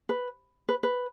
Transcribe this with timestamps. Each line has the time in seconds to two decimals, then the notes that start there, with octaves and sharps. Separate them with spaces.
0.09 B4
0.69 B4
0.83 B4